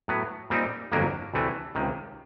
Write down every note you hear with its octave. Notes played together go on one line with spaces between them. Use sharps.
A2 F#3 B3
A#2 G3 C4 D#4
G1 F2 D3 F#3 A#3
D2 C3 E3 A3
C#2 C3 D#3